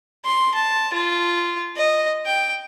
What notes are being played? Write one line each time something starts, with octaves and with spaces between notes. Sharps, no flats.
C6
A5
F4
D#5
G5